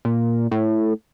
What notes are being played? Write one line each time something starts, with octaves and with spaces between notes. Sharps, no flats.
A#2
A2